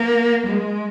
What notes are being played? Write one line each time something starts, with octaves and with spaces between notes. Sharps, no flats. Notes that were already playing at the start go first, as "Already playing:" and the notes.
Already playing: A#3
G#3